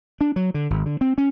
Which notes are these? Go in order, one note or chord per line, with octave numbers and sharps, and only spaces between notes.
D4
F#3
D3
G#1
D3
C4
C#4